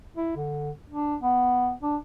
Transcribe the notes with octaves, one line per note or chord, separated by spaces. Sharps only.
E4
D3
D4
B3
D4